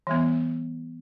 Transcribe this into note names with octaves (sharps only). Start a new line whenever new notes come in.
E3 G3 B3